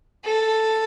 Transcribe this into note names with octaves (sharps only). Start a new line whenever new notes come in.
A4